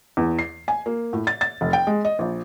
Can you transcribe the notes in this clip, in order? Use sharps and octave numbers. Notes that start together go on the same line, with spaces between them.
E2
C7
G#5
A#3
A2
A6
A6
F1
G5
G#3
D#5
A#1